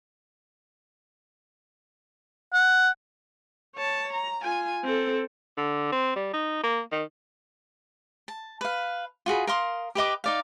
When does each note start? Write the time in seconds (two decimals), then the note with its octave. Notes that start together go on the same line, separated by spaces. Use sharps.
2.53 F#5
3.76 C#5 A5
4.13 A#5
4.43 F4 G#5
4.85 C4 A4
5.57 D3
5.92 C4
6.16 G3
6.34 D#4
6.63 A#3
6.92 D#3
8.28 A5
8.61 B4 F5
9.26 F4 F#4 G#4 B5
9.47 A#4 F5 C6 D#6
9.95 G4 B4 D#5 D6
10.24 D#4 D5 F5